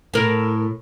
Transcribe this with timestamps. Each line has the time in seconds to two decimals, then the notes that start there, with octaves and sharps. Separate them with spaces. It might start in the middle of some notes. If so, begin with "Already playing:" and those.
0.14 A2 A#4